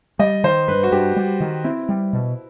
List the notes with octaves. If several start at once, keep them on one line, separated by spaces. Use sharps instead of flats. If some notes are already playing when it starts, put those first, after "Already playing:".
G3 D#5
D#3 C5
G2 B4
F#4
G2 G4
G3
D#3
C4 E4
G3
B2